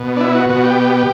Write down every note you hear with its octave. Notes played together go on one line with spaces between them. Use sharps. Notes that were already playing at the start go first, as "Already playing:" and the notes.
Already playing: B2
D4
E4
F#4
B2 F#4
G4